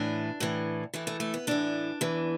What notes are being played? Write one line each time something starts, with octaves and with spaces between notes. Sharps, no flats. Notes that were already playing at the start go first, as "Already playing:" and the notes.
Already playing: A2 E3 D4
A2 E3
A2 E3 A3
A3
A3
B3
A2 E3 D4
E2 E3